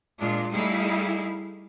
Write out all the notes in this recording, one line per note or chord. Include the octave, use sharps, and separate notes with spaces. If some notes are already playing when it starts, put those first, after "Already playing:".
A#2 G#3 D4 F4
G3 A3 D#4 E4 G#4 F5